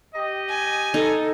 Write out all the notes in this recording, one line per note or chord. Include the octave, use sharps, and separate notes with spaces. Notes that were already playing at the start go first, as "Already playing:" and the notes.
G4 D#5
G#5
D#4 A4